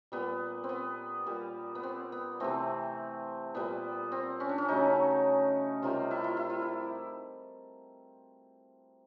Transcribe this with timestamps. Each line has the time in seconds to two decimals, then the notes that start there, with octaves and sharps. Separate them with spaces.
0.12 A#2 G3 B3
0.64 C4
0.69 B3
1.26 A#2 G3
1.75 B3
1.83 C4
2.12 B3
2.40 C3 E3 A3 C4
3.55 A#2 G3 B3
4.12 C4
4.40 C#4
4.49 D4
4.58 C#4
4.68 C#3 F#3 A3 D#4
5.82 C3 D#3 G3 F4
6.11 E4
6.24 F4
6.37 E4
6.50 F4
6.62 E4